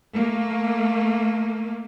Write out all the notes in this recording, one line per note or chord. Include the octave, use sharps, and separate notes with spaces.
A3 A#3